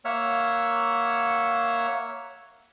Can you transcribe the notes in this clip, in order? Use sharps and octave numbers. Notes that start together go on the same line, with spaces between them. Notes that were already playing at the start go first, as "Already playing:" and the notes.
A#3 C#5 E5 F#5 F6